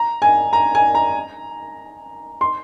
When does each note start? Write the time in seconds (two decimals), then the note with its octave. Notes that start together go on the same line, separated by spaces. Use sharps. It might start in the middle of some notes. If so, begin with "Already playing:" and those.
Already playing: A#5
0.22 G#5
0.53 A#5
0.75 G#5
0.95 A#5
2.41 C6